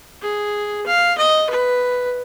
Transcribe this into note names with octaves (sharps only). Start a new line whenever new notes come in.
G#4
F5
D#5
B4